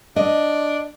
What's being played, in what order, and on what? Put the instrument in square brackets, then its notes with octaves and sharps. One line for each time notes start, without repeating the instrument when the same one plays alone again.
[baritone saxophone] D4 [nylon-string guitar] D#5